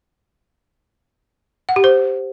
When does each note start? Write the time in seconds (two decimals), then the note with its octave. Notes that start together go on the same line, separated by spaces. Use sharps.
1.69 F#5
1.76 G4
1.84 C5